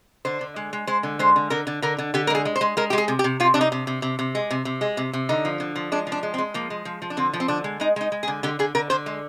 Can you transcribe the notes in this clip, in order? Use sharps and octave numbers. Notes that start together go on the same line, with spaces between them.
D3 C5
D3
G#3
G#3
G#3 C5
D3
G#3 C5
D3
D3 A#4
D3
D3 A#4
D3
D3 G4
A#4
G#3 G#4
G#3
C5
G#3
G#3 A#4
G#3 G4
G#4
C3
G4
C3
C3 F4
C3 D4
D#4
C3
C3
C3
C3
G#3
C3
C3
G#3
C3
C3
D3 D#4
F3
D3
F3
G#3 D4
F3
D4
G#3
C4
G#3
F3 A#3
G#3
F3
F3
D4
D3 C4
F3
C4
D3 D4
G#3
G#3 D#4
G#3 D#4
G#3
G#4
D3
D3 G4
D3 G#4
D3 A#4
D3 C5
G#3